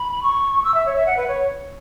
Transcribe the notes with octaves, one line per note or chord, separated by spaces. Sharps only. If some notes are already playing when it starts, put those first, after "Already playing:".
Already playing: B5
C#6
E6
E5
C#5
E5
F#5
B4
C#5